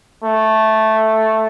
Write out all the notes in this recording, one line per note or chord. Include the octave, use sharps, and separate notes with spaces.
A3